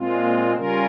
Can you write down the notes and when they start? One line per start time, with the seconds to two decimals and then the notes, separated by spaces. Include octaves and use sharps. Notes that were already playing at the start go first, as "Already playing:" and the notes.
Already playing: A#2 G#3 C4 F4
0.55 C#3 G3 C#4 F4 A#4